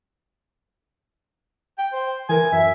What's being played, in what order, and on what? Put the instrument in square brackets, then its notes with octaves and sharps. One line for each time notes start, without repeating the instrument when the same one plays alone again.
[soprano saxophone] G5
C5
[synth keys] E3 A#4 [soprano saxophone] G#5
[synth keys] F#2 [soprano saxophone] E5